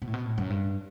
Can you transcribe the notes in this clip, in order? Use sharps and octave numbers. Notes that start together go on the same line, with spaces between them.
B2
A2
B2
A2
F#2
G2